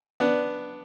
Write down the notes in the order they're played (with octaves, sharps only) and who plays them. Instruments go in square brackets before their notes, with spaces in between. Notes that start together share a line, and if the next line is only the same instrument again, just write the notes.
[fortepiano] B3 D4